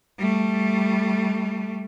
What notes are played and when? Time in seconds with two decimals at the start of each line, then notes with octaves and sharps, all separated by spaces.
0.19 G3 A3